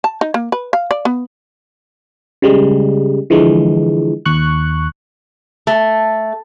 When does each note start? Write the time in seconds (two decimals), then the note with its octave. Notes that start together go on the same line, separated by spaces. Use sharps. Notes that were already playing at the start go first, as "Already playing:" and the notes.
0.04 A5
0.21 D#4
0.34 A#3
0.52 B4
0.73 F5
0.91 D5
1.05 B3
2.42 C#3 G3 G#3
3.30 D3 E3 F3 G#3
4.25 D#2 C#6 F#6
5.67 A3